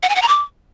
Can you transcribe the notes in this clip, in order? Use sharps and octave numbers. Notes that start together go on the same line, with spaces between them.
F#5
G#5
F#5
A#5
D6